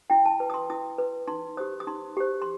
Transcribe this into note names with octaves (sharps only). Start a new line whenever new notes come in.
E4 G5
A5
B4
D#6
C6
E4 D#6
B4
D#4 C6
G4 C5 D#6
D#6
D#4 C6
G4 C5
C6